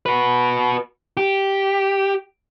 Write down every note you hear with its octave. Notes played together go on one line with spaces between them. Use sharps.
F#4 B4
G4